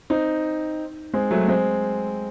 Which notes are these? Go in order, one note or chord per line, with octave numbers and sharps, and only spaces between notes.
C4 D#4
G#3 C4
F#3 A3
G#3 C4